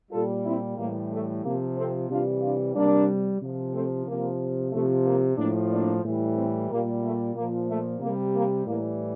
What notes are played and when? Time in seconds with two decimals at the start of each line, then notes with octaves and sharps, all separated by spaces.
0.12 A#2 G3 F4 A4
0.44 C4 E4
0.77 A2 E3 G3 A#3
1.11 A3
1.43 C3 F3 A#3
1.76 A3 C4
2.08 C3 E3 G3 D4 F4
2.41 D4 F4
2.74 C3 G3 A#3 D4
3.40 C3 F3
3.73 A3 C4
4.06 C3 F3 A#3
4.71 C3 F3 A3
5.05 A#3
5.37 A2 F3 A#3 D4
5.70 A#3 D4
6.04 A2 E3 G3
6.35 A3 C4
6.69 A#2 G3 A#3
7.02 A3
7.34 A#2 F3 A#3
7.67 A3
7.99 C3 A#3
8.05 G3
8.33 A#3
8.65 A2 E3 G3 A#3